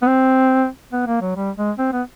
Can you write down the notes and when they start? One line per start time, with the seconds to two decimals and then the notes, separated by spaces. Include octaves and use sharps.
0.02 B3
0.07 C4
0.93 B3
1.07 A#3
1.21 F#3
1.36 G3
1.56 G#3
1.78 C4
1.93 B3